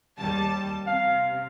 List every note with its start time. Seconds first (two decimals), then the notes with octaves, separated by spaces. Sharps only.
0.19 D#2 G3 A5
0.87 C3 F5